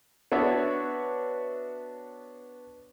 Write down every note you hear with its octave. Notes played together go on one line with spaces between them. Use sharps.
B3 D4 F#4 C#5 D5 E5